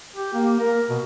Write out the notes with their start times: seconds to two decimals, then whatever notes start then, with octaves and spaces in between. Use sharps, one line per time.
0.16 G4
0.34 A#3
0.60 A#4
0.90 B2